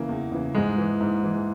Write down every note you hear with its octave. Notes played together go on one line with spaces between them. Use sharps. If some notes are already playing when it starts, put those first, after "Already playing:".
Already playing: C#3 E3 A#3
E2
C#3 E3
G#2 G#3
E3
G#2
E3